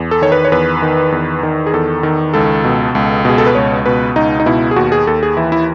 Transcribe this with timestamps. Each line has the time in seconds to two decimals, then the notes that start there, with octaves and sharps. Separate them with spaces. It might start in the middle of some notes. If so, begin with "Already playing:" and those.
Already playing: E2
0.11 A4
0.22 D#3 C#5
0.32 B4
0.45 C#5
0.52 E2 B4
0.82 D#3
1.12 E2
1.43 D#3
1.66 G#4
1.74 E2 A4
2.03 D#3
2.34 C#2 A4
2.64 B2
2.95 C#2
3.25 B2 G#4
3.38 A4
3.46 B4
3.55 C#2 C#5
3.86 B2 B4
4.16 C#2 D#4
4.40 D#4
4.46 B2 E4
4.71 G#4
4.76 D#2 F#4
4.92 G#4
5.07 D#2 A4
5.23 G#4
5.37 E3 E4
5.52 E4